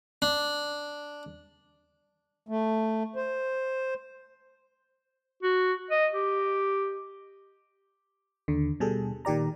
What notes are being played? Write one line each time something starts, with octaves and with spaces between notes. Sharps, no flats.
D4
A3
C5
F#4
D#5
G4
D#2 D3
B2 G3 G#4 A4
A#2 D#3 G4 D5 A#5